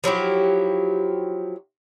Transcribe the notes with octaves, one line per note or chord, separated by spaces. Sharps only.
F3 F#3 E4 G4